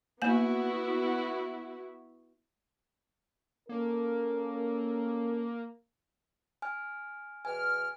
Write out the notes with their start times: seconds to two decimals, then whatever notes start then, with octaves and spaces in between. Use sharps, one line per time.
0.22 A#3 B3 E4 F#4 G#5
3.69 A#3 C#4 A4 A#4
6.62 G#5 F6
7.45 E2 B2 G#5 F6